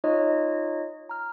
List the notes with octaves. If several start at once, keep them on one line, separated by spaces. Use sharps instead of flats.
D#4 F4 C#5 D#5
A#5 F6